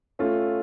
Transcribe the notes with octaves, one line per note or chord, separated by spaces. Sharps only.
A3 C#4 F4 A4